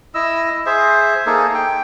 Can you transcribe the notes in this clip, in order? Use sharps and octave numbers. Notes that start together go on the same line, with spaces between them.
E4 D#5 E6
G#4 C5 E5
A#3 D#4 G#4 A4
G5